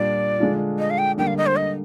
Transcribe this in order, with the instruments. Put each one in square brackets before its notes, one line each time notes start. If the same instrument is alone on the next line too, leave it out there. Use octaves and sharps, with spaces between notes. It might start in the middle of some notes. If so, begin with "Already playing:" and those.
Already playing: [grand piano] A#2 G3 D4 F4 [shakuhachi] D5
[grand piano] D3 G#3 D4 F4
[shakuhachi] D#5
F5
G5
[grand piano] D3 G3 A#3 [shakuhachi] G5
[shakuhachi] F5
D#5
C5
D#5